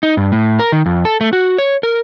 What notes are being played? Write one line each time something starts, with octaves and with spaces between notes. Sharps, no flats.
D#4
G2
A2
A#4
D#3
F2
A4
A3
F#4
C#5
A#4